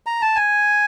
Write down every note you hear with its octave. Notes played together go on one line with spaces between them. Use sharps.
A#5
A5
G#5